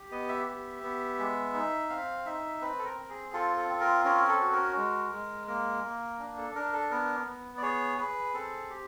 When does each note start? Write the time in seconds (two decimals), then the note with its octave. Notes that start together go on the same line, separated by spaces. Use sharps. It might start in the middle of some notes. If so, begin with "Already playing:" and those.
Already playing: G4
0.11 B3 D#5
0.29 E5
0.46 G4
0.83 B3
1.19 G#3
1.54 D#4
1.89 C4 F5
2.26 D#4 E5
2.61 C4 B4
2.79 A4
2.85 A#4
2.97 C4
3.10 G#4
3.33 F4 A4
3.56 A4
3.69 C4
3.81 A#4
4.05 C#4 A#4
4.28 A4
4.40 F#4
4.52 A#4
4.77 G#3
5.12 G#3
5.48 A#3 A#4
5.84 A#3
6.19 D4
6.37 A4
6.55 D4 A#4
6.73 A4
6.91 B3 A#4
7.27 B3
7.58 D5
7.62 G#4 C#5
7.98 G#4 B4
8.34 C4 A4
8.70 G4